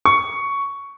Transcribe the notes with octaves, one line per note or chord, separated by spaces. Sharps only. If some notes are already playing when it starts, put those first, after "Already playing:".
C#6